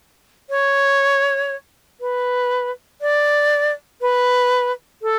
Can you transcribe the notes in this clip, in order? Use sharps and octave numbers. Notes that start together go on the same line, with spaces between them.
C#5
B4
D5
B4
A4